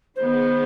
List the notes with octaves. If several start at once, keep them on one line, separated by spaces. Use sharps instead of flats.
D#3 G#3 B3 C5